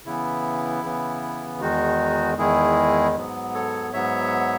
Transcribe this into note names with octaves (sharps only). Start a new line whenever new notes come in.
C#3 E3 B3 E4
C#3 E3 B3
E2 D#3 G#3 D#4 F#4
E2 D#3 G#3 E4 G#4
G#2 F#3 B3
A4 C#5
G#2 F#3 B3 C#5 E5